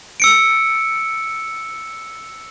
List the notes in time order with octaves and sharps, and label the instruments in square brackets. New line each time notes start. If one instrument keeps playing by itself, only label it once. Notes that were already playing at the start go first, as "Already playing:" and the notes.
[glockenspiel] E6 C#7 D7